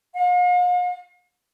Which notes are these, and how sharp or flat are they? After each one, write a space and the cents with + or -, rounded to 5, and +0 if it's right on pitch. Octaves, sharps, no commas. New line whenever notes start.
F5 +45